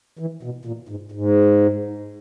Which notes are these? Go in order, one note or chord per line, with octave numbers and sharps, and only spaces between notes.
E3
B2
A#2
G#2
G#2